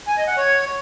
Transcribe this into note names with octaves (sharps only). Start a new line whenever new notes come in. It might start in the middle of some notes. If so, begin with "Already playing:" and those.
G#5
D#5
F#5
C#5